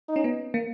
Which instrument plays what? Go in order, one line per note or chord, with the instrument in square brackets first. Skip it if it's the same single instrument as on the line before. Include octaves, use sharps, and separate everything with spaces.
[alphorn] D#4
[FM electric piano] C#4
B3
A#3